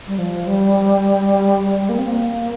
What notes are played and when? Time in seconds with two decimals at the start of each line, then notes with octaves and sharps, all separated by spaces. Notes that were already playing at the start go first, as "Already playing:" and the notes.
0.07 G3
0.18 F3
0.47 G3
1.89 A#3
1.98 C4
2.07 A#3